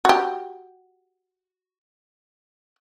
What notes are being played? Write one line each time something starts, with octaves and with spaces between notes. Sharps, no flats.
F#4 G4